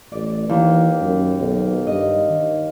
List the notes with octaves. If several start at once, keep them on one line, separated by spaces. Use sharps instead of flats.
A1 D5
D#2 E3
F#2
B1
G2 D#5
D#3